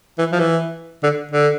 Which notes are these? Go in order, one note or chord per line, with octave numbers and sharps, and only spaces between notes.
E3
F3
E3
D3
D3